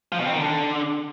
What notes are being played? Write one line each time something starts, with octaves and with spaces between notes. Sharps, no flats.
F3
B2
C4
D#3
D3